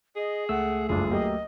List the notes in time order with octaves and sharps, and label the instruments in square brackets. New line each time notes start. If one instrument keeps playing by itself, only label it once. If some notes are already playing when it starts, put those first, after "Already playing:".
[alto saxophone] G#4 [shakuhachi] D#5
[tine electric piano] C#2 A3 E6 [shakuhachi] F#5
[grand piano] F#1 G2 F4 [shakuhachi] D4 [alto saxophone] G#4
[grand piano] F#3 A#3 G4 [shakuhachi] D#5